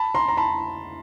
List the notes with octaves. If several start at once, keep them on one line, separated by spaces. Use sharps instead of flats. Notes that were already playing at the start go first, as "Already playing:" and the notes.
Already playing: A5 B5
A#5 C6
A#5
A5 B5